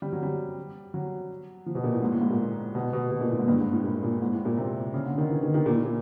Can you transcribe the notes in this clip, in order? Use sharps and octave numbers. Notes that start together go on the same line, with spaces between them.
G3
F#3
G3
F#3
F3
B2
A#2
A2
G#2
A2
G#2
A#2
B2
B2
B2
A#2
A2
G#2
G2
G#2
A2
A#2
A#2
G#2
A2
A#2
C3
C#3
D3
D#3
E3
D#3
D#3
A#2
A2
A#2